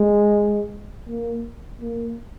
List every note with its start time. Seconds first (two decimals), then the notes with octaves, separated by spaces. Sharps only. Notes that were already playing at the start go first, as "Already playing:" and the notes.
Already playing: G#3
1.09 A#3
1.81 A#3